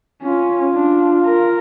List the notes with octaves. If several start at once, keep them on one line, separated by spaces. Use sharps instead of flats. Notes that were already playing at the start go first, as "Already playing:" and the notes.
C#4 F4
D4
A#4